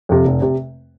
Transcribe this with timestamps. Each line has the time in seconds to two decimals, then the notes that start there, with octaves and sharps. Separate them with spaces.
0.09 F2 C3
0.25 F1
0.42 C3